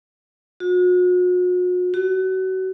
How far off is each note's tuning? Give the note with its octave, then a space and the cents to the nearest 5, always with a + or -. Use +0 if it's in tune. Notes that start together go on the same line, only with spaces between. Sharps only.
F#4 -40
F#4 +30